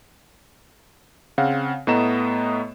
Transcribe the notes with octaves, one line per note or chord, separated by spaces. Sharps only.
C#3 C4 F5 F#5
A2 A3 B3 D#5 A#5 E7